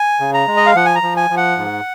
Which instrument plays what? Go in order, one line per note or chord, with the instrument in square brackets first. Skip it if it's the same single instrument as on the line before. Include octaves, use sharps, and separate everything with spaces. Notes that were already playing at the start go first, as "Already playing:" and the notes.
Already playing: [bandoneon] G#5
C#3
A#5
G#3
D#5
F5
F3 F#5
G#5
A#5
F3
G#5
F3
F#5
G#2